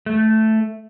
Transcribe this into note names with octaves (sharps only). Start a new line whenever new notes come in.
A3